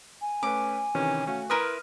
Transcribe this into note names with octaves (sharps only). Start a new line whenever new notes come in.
G#5
A3 C#4 B4 D6
C3 D#3 E3 C#4
A3 C#4 F#4 F5
E4 A#4 B4 C6 D#6 F6 D#7